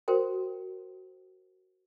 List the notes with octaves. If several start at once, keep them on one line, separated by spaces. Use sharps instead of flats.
F#4 A#4 C5 G5